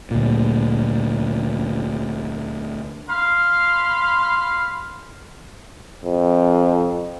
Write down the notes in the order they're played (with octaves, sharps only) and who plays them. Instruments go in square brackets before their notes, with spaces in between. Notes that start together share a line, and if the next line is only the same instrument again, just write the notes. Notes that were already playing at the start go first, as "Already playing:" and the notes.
[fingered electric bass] D2 A#2
[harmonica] F5 B5 C6
[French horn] F2